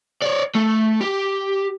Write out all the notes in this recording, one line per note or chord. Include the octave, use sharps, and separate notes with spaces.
C#5 D5
A3
G4